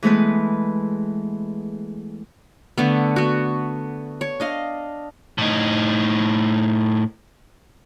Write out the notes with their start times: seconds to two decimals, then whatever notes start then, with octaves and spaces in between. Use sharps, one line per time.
0.03 E3 G#3 A3 B3 B4
2.78 D3 A3 B3
3.16 B3 F#4
4.21 C#5
4.40 D4 D#5 F5
5.38 A2 D#4